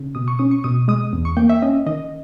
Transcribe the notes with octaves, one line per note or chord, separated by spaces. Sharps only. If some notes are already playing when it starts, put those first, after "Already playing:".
Already playing: C#3
B2 D#6
C#6
C#4 D#6
C#6
B2 D#6
G#3 D#6
E2
C#6
A#3 G5
E5
C#4 D#5
D#3 D#5